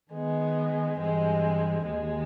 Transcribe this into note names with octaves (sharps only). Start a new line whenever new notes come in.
D#3 G#3 B3
G2 E3 G#3 C4
D#2 D#3 G#3